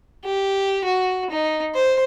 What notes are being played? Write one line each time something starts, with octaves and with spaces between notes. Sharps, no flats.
G4
F#4
D#4
C5